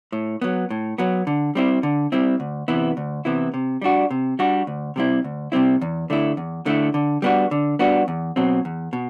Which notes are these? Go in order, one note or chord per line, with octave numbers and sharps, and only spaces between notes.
A2
F#3 B3
A2
F#3 B3
D3
G3 C4 E4
D3
G3 C4 E4
D2
C3 E3 B3 E4
D2
C3 E3 B3 E4
C3
G3 D4 F#4
C3
G3 D4 F#4
D2
C3 G3 C4 E4
D2
C3 G3 C4 E4
E2
D3 A3 E4
E2
D3 A3 E4
D3
G3 B3 D4 F#4
D3
G3 B3 D4 F#4
E2
B2 F#3 C4
E2
B2